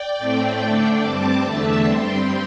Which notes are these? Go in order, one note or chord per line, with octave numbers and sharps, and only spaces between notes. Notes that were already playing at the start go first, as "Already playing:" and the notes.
Already playing: D5 G5
A2 A3 C4
D3 A3 D4
G2 G3 C4 A5 D6
E2 D3 A3 D4 E5 A5
G2 G3 C4 G5 C6